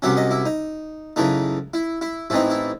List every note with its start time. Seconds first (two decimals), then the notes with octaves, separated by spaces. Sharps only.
0.02 C2 C3 F#3 C#4 E5
0.17 D#5
0.31 E4
0.46 D#4
1.16 F#2 C#3 E3 A3 D#4
1.74 E4
2.01 E4
2.30 A1 A2 E3 C4 D#4 E4
2.50 E4